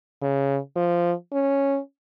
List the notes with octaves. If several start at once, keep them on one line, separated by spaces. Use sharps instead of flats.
C#3
F3
C#4